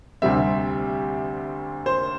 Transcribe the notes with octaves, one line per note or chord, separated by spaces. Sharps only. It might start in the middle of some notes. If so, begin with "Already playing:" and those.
D2 C3 G3 C4 E5
C5